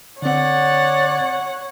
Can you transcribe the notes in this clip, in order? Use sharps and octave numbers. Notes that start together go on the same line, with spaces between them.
D3 C4 C#5 D5 F#5